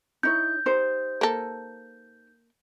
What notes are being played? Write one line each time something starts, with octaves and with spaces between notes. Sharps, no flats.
D#4 E4 C#5 G6
D#4 G4 C5
A#3 A4